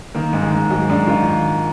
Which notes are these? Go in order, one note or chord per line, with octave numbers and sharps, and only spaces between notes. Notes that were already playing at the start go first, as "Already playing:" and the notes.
D#3 A#3
G#2
G#3
G#2
G#2 F#3
G#2 D4
D#3 F4